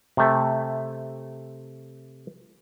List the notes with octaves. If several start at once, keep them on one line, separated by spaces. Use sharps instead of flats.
C3 A3